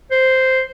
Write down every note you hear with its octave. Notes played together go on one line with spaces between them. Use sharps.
C5